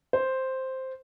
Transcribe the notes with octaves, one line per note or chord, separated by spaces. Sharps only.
C5